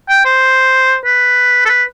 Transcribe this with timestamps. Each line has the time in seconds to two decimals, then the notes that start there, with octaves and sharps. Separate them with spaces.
0.09 G5
0.25 C5
1.05 B4
1.65 A4
1.69 B4